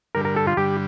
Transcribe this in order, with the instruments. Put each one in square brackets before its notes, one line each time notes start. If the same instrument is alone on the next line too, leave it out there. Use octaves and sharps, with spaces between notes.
[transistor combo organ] G2 D3 G3 [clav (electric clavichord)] A#4
[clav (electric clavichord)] A#4
A4
F4
[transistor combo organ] G2 D3 G3 [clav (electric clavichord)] G4